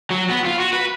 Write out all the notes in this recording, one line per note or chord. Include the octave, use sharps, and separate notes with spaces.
F#3
B3
F4
F#4
B4